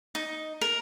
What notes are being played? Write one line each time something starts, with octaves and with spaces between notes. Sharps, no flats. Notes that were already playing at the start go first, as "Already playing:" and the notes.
D#4
A#4